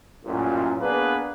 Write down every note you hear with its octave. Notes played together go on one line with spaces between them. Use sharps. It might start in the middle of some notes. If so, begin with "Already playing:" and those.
A1 F#2 A#2
A#3 B3 D4 G#4 A#4 B4